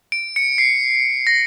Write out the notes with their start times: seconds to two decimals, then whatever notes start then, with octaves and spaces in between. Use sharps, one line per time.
0.12 D7
0.36 C#7
0.58 C7
1.27 A#6